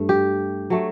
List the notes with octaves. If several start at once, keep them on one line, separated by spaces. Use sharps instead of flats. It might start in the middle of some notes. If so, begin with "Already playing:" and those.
Already playing: G2 A3
G4
F#3 A3